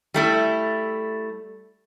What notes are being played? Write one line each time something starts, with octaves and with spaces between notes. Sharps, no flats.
G3 A3 E4